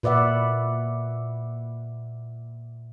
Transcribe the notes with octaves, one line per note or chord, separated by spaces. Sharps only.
A#2 B4 D5 E5 F#5